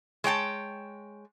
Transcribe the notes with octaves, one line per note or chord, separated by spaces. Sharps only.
G#3 C#5 G5 A5